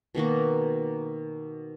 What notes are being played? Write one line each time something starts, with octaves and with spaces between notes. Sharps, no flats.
B2 D#3 A#3 F#4